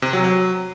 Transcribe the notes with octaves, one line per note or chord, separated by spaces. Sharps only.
C3
F#3
F#3